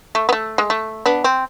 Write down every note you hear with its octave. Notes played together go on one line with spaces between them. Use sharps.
A3
B3
A3
G#3
A3
B3 D4
C4